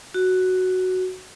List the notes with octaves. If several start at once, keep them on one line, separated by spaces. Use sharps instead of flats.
F#4